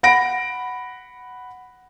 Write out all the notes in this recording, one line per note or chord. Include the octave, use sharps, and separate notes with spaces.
F#5 B5 A#6 D7